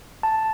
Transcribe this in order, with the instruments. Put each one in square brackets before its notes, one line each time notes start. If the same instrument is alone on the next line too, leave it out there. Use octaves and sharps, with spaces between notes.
[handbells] A5